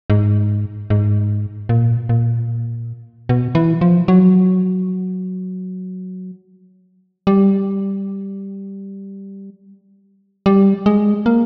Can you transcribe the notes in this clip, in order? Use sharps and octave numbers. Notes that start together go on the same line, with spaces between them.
G#2
G#2
A#2
A#2
B2
E3
F3
F#3
G3
G3
G#3
A#3